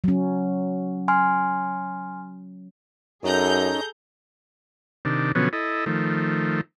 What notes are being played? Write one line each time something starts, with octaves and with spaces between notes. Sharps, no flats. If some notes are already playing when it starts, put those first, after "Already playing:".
F#3 C#4
G#5 C6 F6
F#2 C#4 D#4 G#4 A4 A#5 G6
C3 D#3 D4
B2 D3 F3 F#3 B3 C#4
E4 A4 D#5
D#3 F3 A3